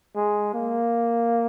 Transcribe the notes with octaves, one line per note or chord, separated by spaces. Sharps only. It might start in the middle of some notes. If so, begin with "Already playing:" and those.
G#3
A#3